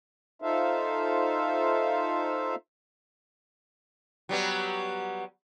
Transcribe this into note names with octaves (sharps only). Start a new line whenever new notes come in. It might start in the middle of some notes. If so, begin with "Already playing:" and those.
D#4 F4 A4 C5 E5 F5
F#3 G3 B3